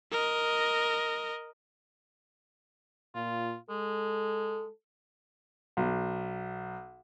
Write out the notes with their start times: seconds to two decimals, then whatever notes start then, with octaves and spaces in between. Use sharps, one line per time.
0.12 A#4 D#5
3.15 A#2 F4
3.70 G#3 A4
5.77 B1